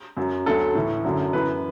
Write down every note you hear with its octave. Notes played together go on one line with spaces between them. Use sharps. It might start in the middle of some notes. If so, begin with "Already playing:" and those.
F#2 F#3
D2 D3 F#3 A4
A2 E3
F#2 D3 F#3
F#2 E3 B4